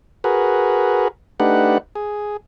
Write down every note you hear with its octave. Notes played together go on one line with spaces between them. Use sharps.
F#4 G#4 A#4 B4
A3 D4 D#4 G4 B4 F#5
G#4